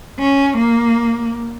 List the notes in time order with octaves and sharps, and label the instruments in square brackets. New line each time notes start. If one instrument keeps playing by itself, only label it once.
[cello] C#4
A#3